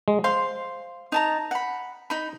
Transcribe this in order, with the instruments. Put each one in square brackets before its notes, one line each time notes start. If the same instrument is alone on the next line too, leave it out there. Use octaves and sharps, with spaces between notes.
[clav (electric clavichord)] G#3
[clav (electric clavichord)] C5 [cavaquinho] F5 C6
[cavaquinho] D#4 A5 A#5
F#5 B5
D#4 B5